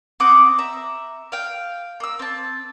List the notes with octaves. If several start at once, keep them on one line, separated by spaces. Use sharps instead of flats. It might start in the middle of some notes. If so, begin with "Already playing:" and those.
C4 F#5 D6 D#6
E5 A#5
F5 G5
A#3 E6
C4 A5